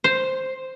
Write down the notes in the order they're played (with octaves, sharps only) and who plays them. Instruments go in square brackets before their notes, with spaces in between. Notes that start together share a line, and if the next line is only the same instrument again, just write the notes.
[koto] C5